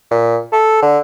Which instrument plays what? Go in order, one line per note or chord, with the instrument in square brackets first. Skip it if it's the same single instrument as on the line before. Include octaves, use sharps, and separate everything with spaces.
[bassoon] A#2
A4
D3